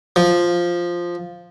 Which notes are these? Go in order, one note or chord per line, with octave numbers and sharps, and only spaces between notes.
F3